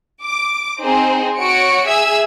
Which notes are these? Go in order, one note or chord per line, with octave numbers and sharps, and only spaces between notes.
D6
C4 D#4 G#4 C5
F#4 C#5 C#7 D7
G#4 E5 E6 G#6